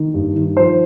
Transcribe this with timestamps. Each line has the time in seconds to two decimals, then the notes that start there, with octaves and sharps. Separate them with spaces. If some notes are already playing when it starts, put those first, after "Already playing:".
Already playing: D#3
0.14 G2
0.35 D#3
0.57 F3 C5